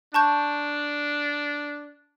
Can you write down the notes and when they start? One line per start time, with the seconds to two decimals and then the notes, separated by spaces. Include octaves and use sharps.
0.14 D4 A5 C#6 G6